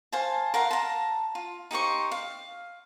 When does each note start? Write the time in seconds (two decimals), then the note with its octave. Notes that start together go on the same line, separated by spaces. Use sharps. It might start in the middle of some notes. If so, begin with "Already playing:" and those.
0.12 C5 F5 G#5 A5
0.54 A#4 F5 F#5 C6
0.71 A5 A#5
1.35 F4
1.71 D#4 G4 C5 C#6
2.12 F5